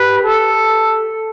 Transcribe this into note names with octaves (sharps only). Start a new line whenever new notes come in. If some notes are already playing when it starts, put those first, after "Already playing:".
Already playing: G4 B4
A4